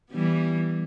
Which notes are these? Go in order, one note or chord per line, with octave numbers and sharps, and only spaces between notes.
E3 G3 B3